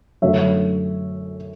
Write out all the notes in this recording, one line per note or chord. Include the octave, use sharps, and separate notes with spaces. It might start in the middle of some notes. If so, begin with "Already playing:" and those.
F#2 D3 A3 C#5 E5